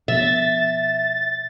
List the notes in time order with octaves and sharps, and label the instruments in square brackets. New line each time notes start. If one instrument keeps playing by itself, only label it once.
[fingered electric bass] B2 F3 B3 [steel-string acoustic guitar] E5 [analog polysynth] A6